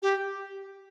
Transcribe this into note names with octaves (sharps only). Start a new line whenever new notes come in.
G4